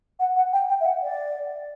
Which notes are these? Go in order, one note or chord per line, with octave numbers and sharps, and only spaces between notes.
F#5
F#5
G5
G5
E5
F#5
D5